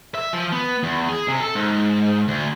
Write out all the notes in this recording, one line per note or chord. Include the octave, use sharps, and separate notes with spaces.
E5
F3
B3
E2
G#4
C3
A4
G#2
D2